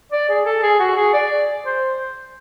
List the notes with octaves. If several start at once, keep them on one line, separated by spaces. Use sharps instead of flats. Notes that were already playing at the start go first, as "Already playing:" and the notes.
D5
G#4
A4
G#4
F#4
G#4
D5
C5